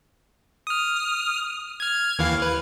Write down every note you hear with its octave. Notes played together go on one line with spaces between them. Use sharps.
D#6 F6
F6 G#6
D#2 E3 F5
B4